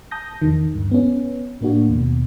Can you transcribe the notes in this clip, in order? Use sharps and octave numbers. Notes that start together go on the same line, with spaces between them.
A5 D#6 G6 A#6
E2 D#3
D2 G2
B3 C#4
A2 A#3 D4 F#4
D#2 B2